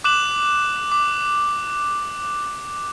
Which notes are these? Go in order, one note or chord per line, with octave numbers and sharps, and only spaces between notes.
D6 F#6 E7 F#7
D6